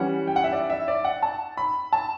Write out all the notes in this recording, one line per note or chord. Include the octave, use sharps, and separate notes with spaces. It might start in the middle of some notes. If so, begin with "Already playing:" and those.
Already playing: E3 G3 C#4 F#5
G5
F#5
E5
D5
E5
D5
F#5
A5
B5
A5